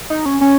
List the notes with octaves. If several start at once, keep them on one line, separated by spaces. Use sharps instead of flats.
D#4
C#4
C#4